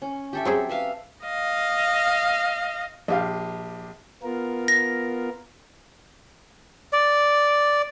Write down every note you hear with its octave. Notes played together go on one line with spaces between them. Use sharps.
C#4
G4 A4 E5
F#3 C4 G#4
B4 E5 F5
D#5 F5
A#1 G4 F5
B3 F4 A#4
A#6
D5